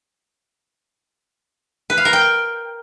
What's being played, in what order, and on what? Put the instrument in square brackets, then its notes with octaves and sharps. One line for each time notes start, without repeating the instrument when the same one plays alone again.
[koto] B4
F5
A#4
G5